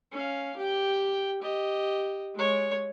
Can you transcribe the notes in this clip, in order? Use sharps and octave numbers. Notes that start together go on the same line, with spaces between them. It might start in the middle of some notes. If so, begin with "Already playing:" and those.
C#4 F5
G4 G5
G4 D#5
G#3 C#5